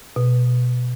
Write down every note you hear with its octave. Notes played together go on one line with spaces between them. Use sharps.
B2